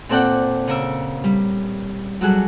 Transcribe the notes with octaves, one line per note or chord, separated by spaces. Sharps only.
A#2 C4 A4 D5 F#5 G5
C#3 A#4 E6
G3
F#3 G3 F#4 G#4 A4